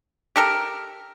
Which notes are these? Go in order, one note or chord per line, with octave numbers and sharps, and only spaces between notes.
G4 A4 A#4